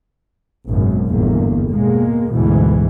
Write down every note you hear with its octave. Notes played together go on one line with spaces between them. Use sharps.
G#1 F#2 B2
G1 E2 A2 A#3
B2 G#3 A#3
D2 G#2 B2 E3